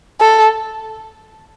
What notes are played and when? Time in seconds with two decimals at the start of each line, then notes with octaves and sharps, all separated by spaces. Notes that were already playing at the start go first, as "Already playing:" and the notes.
0.21 A4